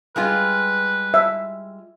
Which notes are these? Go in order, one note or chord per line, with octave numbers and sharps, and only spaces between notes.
G3 G#3 F4 B4
E5